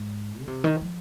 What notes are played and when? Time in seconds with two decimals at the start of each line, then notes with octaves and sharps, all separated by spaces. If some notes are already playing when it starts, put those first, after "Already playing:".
Already playing: G#2
0.42 D3
0.47 C3
0.64 D#3
0.81 F3